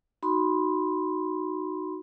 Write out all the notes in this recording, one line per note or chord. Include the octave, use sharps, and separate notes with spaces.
D#4 F#4 B5 C6